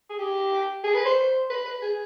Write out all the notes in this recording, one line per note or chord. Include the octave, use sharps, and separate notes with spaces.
G#4
G4
G#4
B4
C5
B4
B4
G#4